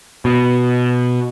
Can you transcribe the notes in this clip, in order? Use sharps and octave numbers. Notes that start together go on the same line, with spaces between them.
B2